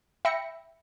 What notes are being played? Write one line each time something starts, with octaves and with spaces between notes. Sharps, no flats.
E5 G5 B5 A#6 C#7